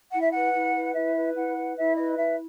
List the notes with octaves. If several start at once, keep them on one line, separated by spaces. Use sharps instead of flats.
E4 F#5
E5
B4 F#5
E4
B4
E4 E5
B4
E4 F#5
B4
E4 E5
B4 D#5
E4 E5